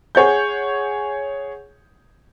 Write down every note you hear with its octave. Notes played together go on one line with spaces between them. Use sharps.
G#4 C#5 F#5 G6